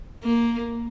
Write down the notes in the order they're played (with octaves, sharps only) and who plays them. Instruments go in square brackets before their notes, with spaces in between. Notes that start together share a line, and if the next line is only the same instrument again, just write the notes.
[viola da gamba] A#3